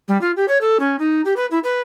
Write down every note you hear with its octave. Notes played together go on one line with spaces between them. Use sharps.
G3
F4
G4
C#5
A4
C#4
D#4
G4
B4
E4
B4